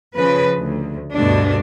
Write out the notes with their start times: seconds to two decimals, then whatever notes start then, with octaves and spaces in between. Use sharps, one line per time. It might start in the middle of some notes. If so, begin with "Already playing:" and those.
0.17 C#3 F3 B4
0.59 D2
1.15 D2 G2 B2 D4